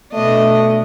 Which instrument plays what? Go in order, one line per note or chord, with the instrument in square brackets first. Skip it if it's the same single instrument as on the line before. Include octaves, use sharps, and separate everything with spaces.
[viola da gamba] B2 D4 D#5 [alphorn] A3